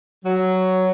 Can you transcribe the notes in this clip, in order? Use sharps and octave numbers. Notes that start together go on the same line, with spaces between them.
F#3